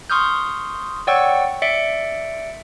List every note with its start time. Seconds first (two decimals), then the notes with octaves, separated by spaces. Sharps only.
0.10 C6 C#6 D#6 F6 G6
1.07 C#5 D5 F#5 G5 C#6 E6
1.62 D5 E5 C#7 D7